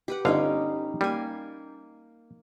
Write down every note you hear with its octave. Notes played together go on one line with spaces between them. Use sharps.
G4 B4 F#5
G1 D3 C#4 D#4 G4 F5
G3 A#3 G#5